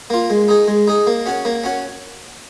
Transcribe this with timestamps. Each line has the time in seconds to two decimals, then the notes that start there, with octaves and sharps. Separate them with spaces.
0.10 A#3 F4
0.30 G#3
0.48 D#4 G#4
0.68 G#3
0.87 D#4 G#4
1.07 A#3
1.26 C#4 F#4 C#5
1.45 A#3
1.64 C#4 F#4 C#5